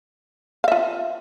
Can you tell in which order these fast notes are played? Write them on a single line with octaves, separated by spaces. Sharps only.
F5 E5 F4